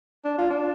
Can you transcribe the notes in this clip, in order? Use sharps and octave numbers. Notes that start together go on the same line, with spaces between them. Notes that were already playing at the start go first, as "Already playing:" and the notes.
D4
F4
D4